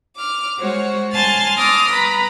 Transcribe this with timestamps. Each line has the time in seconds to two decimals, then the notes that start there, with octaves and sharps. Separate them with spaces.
0.16 D6 F6
0.57 G#3 F#4 C5 C#5
1.12 G#5 A5 C6 F6 A6
1.57 C6 D6 D#6 F6 A#6
1.91 B4 A#5 B5